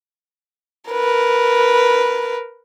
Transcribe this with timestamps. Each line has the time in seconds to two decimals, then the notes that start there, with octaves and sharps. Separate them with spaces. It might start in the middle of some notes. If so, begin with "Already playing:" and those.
0.91 A#4 B4